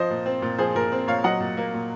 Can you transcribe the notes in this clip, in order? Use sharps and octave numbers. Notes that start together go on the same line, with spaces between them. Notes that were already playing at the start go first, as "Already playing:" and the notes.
Already playing: F3 C5 D#5
A#2
C4
A#2
F3 G#4 C5
A#2 A#4
C4
A#2 C#5 F5
F#3 D#5 F#5
A#2
A#3
A#2